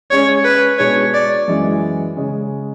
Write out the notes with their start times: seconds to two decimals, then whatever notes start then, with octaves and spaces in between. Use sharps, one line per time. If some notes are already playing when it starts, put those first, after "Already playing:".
0.11 G#3 C#4 G#4 C#5 D5
0.45 B4
0.79 B2 G#3 D4 G#4 C#5
1.14 D5
1.48 F#2 E3 G#3
2.16 C#3 G#3 C#4 G#4